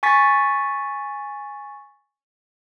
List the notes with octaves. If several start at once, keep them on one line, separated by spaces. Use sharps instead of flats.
G#5 C#6 A6 B6